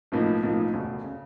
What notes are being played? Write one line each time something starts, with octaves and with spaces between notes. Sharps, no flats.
B1 A2 F3 A#3 D#4
B1 A2 F3 A#3 D#4
E1 D2 C#3
C#3